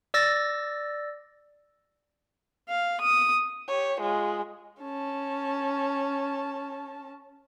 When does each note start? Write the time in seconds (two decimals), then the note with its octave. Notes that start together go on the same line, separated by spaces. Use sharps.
0.14 D5 E6 A6 A#6
2.69 F5
3.01 D#6
3.68 G4 C#5
3.99 G#3 F4
4.82 C#4 A5